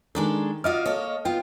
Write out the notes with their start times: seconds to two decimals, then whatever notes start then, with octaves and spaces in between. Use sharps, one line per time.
0.15 D#3 G#3 D4 A4
0.64 F4 F#4 D5 D#5 F6
0.86 A#3 A4 C#5
1.25 B3 F4 G5